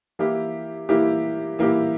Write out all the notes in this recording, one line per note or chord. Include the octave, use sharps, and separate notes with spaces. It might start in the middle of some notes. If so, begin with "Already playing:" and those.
E3 A#3 E4 G4
E3 A#3 E4 G4
E3 A#3 E4 G4